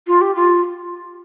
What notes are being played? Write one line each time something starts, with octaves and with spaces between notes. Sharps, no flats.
F4
G4
F4